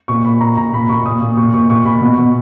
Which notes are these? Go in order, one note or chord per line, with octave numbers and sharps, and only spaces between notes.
A#2 C#6
A#2 B5
A#2 A#5
A#2 A#5
A#2 B5
A#2 C#6
A#2 D#6
A#2
A#2 C#6
A#2 C#6
A#2 C#6
A#2 B5
B2
B2